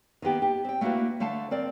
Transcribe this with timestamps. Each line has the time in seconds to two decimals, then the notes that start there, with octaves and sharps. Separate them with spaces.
0.22 D#3 A#3 B3 G4
0.42 G4
0.65 C4 G5
0.81 A3 A#3 D4 E4 F#4 B4
1.20 D3 A3 F5 A5
1.51 C4 A#4 D5